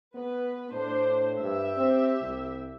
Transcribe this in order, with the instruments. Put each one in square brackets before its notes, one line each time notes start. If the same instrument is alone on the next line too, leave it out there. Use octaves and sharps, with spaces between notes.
[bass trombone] B3 [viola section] B4
[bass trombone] A2 [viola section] D4 C5
[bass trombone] G2 [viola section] G4 E5
[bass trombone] C4
C2